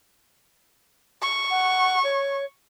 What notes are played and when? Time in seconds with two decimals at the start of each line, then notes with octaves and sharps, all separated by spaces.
1.22 C#6
1.51 F#5
2.04 C#5